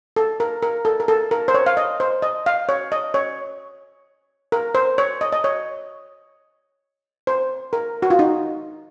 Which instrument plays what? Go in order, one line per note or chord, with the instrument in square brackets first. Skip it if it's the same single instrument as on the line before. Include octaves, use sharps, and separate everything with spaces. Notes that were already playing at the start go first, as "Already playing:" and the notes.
[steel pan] A4
A#4
A#4
A4
A#4
A4
A#4
C5
C#5
F5
D#5
C5
D#5
F5
C#5
D#5
C#5
A#4
C5
C#5
D#5
D#5
C#5
C5
A#4
F#4
F4
D#4